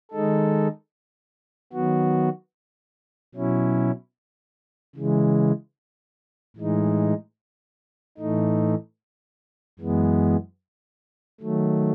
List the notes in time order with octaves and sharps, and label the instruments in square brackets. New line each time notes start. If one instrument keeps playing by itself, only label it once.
[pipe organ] D#3 G#3 D#4 A4
D#3 F#3 B3 F#4
B2 F#3 C#4 E4
C#3 E3 G#3
A2 E3 G#3 D#4
A2 E3 A3 D#4
F#2 E3 G#3 B3
D#3 F#3 A3